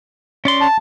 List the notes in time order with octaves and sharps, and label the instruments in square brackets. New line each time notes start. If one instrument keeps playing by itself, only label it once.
[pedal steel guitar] C#4 D5 C6
[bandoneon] A5